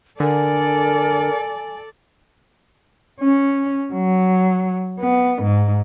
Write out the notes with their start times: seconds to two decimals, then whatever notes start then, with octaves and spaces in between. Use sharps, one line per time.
0.20 D3 A4 A#4 D5 G#5
3.20 C#4
3.93 F#3
5.00 B3
5.43 G#2